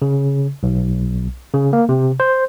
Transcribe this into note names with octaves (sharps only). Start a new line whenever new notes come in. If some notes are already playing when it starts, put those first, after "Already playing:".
C#3
B1
C#3
A#3
C3
C5